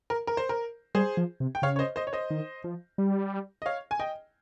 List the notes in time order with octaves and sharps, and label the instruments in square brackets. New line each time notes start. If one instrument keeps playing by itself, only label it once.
[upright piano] A#4
A#4
C5
A#4
[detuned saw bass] G3 [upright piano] G#4 C5
[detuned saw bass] F3
C3
[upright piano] G5
[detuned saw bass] C#3 [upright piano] C#5 F5
[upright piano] C#5
C5 D#5
C5 D#5
C#5
C5 D#5
[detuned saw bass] D#3
F3
G3
[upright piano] D#5
C#5 F5
G#5
D#5 G5